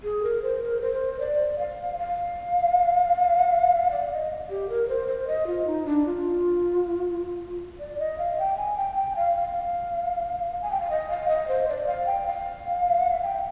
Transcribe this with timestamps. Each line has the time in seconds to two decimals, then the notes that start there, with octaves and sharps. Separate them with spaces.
0.04 G#4
0.23 A#4
0.43 C5
0.63 A#4
0.81 C5
1.20 D5
1.59 F5
1.98 F5
3.91 D5
4.12 D#5
4.50 G4
4.69 A#4
4.89 C5
5.08 C5
5.27 D#5
5.47 F4
5.67 D#4
5.85 D4
6.06 F4
7.80 D5
7.99 D#5
8.18 F5
8.39 G5
8.57 G#5
8.77 G5
8.96 G5
9.16 F5
9.36 F5
10.62 G#5
10.71 G5
10.80 F5
10.90 D#5
11.10 F5
11.29 D#5
11.48 C5
11.68 D5
11.87 F5
12.06 G5
12.27 F5
13.23 G5